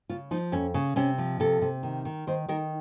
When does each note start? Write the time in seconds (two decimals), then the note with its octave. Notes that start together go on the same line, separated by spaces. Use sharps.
0.09 C#3 F4
0.31 F3 D#4
0.52 F2 C#4
0.74 C#3
0.96 C3 C#4
1.18 F3
1.40 C3 A4
1.62 C3
1.83 D#3
2.05 D#3
2.27 D#3 C5
2.49 D#3 A#4